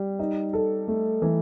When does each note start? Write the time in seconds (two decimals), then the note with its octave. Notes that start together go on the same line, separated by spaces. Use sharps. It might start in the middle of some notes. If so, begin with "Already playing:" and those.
Already playing: G3
0.19 D#4
0.53 A4
0.88 A3
1.22 E3